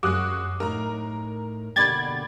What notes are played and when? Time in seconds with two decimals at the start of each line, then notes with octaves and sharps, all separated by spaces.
0.03 F#2 G#3 F#4 D6 D#6 F#6
0.60 A2 D#4 A#4 A#5
1.76 B2 D3 A#3 G4 D5 B5 G#6 A6